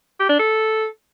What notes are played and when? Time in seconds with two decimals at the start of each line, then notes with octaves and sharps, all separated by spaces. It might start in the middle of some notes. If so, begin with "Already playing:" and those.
0.20 G4
0.30 D4
0.39 A4